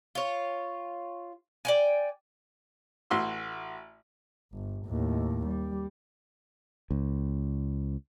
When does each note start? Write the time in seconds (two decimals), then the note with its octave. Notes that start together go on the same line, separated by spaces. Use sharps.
0.15 F4 C#5
1.65 D5 G5 G#5
3.10 A1 F#4 C6 E6
4.53 G1
4.86 D#2 A2
5.46 G3
6.91 C#2